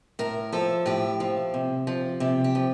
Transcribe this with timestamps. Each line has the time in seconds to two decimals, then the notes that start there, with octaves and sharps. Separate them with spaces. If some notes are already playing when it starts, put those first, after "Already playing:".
0.19 A2 A#4
0.52 F3 A4
0.86 A2 G4
1.20 F3
1.54 C3
1.87 F3
2.20 C3 G4
2.44 G4
2.55 F3